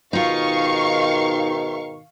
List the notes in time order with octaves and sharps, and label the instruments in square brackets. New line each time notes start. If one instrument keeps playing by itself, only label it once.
[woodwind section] G#2 B2 D#3 [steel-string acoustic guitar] D#4 F4 [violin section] F5 C#6